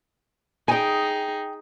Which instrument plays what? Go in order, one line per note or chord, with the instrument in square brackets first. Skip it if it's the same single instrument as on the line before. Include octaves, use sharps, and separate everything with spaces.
[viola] D#4 G#4 [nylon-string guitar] G5 G#5